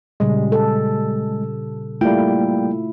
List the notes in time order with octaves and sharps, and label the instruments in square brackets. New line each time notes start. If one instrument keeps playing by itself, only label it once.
[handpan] A#2 C#3 G3 [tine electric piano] G#3
[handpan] A4
[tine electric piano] G3 A#3 G5 [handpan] A3 E4 F4